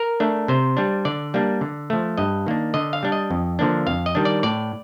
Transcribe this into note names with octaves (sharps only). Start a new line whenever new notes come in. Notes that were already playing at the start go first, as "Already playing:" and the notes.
Already playing: A#4
A3 D4
C3 C5
G3 D4
D3 D5
G3 A#3 D4
D3
F3 A3
G2 D#5
D#3 A#3 D4
D3 D#5
F5
G3 D4
D#5
F2
D3 F3 A#3 D4
F2 F5
D#5
D#3 G3 D4
D5
A2 D5